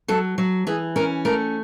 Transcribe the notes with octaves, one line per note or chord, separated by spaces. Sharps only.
F#3 A4
F#3
E3 G#4
C#4 A#4
A3 A#4